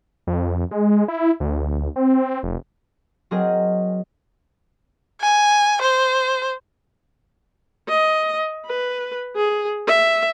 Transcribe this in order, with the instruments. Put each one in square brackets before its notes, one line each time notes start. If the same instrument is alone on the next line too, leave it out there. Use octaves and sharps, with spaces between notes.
[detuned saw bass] F2
G#3
E4
D2
C4
F1
[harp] F#3 C4 G#4 A#4 D#5
[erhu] G#5
C5
[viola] D#5
B4
G#4
E5